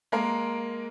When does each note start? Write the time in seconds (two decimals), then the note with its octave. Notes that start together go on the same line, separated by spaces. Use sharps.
0.12 G#3 A#3 A#4